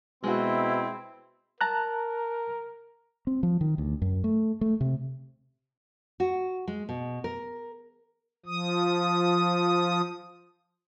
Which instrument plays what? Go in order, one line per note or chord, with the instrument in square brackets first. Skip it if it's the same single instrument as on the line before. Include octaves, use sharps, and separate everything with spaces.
[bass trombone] B2 [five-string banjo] G#3 F#4 [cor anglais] C4 [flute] E4
[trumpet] A#4 [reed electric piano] A5 A#5 F#6
[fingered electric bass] C4
F3
D#3
D2
F#2
A3
A3
C3
[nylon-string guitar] F#4
G#3
B2
A#4
[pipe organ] F3 D#6